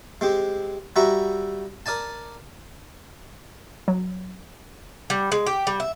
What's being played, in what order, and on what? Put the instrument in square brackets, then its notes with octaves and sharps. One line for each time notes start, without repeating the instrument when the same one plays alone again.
[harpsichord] G#3 C4 G4
G3 F#4 E5 A#5 C#6
A#4 D5 G#5 A5
[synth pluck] F#3
[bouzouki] G3
G#3
G4
G3
E5